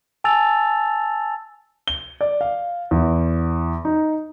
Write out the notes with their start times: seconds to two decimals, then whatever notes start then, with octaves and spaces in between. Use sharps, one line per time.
0.24 G#5 A5 E6 A6 F7
1.88 G7
2.21 D5
2.41 F5
2.91 E2
3.85 D#4